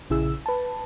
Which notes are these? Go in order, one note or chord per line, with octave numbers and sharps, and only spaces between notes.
A#1 C#3 E4 G#4 E6
B4 A5